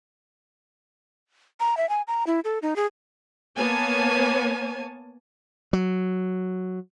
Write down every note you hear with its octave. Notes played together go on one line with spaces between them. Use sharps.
A#5
E5
G#5
A#5
E4
A4
D#4
G#4
A#3 B3 C#5 G#5 A5
F#3